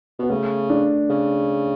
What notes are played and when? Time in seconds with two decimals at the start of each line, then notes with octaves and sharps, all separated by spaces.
0.19 B2 B3
0.30 C#3 A3
0.70 D4
1.10 C#3